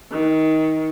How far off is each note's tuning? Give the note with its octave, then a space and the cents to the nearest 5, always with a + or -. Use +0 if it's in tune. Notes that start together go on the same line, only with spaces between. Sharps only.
D#3 +20